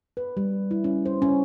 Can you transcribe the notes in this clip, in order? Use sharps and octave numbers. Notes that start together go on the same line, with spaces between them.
B4
G3
E4
C#4
C5
C#4